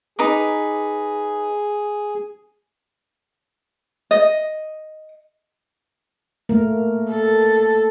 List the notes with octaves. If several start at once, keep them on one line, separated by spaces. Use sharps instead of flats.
D#4 G#4 B4 D6
D#5
A3 A#3 A#4
A4